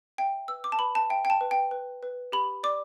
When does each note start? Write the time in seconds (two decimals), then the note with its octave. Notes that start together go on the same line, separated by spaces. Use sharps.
0.18 E5 G5
0.48 B4 E6
0.64 D6
0.72 A5
0.79 B4 B5
0.95 A5
1.10 E5 G5
1.25 G5
1.30 A5
1.41 B4
1.51 G5
1.71 B4
2.03 B4
2.32 G4 B5
2.64 D5 D6